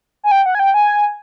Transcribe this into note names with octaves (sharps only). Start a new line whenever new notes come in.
G#5
G5
F#5
G#5
G5
G#5